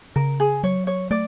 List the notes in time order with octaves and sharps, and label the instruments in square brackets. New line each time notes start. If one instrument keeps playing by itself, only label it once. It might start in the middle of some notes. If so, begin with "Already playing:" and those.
[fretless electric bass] C#3 [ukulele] A#4
[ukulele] G#4
[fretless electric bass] F#3 [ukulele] C#5
[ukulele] C#5
[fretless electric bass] A3 [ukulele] D5